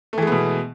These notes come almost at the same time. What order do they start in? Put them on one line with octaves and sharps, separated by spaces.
A3 E3 G#3 B3 B2